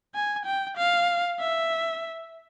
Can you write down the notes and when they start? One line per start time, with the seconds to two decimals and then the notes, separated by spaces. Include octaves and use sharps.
0.14 G#5
0.45 G5
0.77 F5
1.40 E5